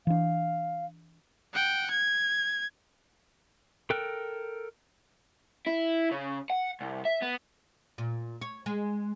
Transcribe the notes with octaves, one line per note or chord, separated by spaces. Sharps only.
E3 D4 F5
F#5 G5
G#6
A4 A#4 G5 F#6
E4
C#3
F#5
C2
E5
B3
A#2
C#5
G#3